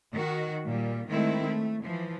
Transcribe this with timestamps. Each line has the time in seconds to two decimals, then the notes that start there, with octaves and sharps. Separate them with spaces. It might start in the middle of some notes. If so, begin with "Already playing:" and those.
0.14 D#3 F#4
0.66 A#2 G3
1.10 D#3 G#3 A3 C4 E4
1.49 A3
1.85 E3 F3